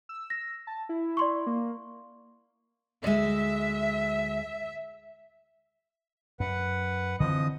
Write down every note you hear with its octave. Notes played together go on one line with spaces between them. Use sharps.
E6
A#6
A5
E4
D5 C6 C#6
A#3
D2 G#3 E5
F#2 B4 F#5
D3 E3 F3 C4 D#5 D#6